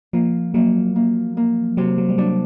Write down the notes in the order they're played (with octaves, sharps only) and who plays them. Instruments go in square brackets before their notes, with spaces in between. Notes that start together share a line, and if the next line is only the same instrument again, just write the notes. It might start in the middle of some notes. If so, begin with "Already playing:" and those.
[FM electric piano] F3 [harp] A#3
[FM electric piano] F#3 [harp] A#3
[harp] A#3
A#3
[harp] C3 [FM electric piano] F#3
[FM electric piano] F#3
G3
[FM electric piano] F#3 [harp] D4